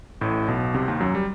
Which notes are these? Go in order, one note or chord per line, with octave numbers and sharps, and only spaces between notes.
A1 A2
B1 B2
C2 C3
D#2 D#3
F#2 F#3
G3